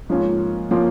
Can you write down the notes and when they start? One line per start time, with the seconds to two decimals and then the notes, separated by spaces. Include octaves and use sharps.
0.09 G#2 F3 A#3 C#4 F4
0.71 F3 A#3 C#4 F4